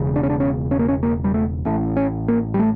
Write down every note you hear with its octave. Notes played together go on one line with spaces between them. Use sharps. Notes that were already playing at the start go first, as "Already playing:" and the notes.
Already playing: E1 E2 C#3
D4
C#4
D4
C#4
C#4
A#3
C#4
A#3
G3
A3
A1 A2 A3
C#4
A#3
G3
A3